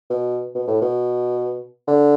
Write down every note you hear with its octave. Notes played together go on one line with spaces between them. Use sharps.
B2
B2
A2
B2
D3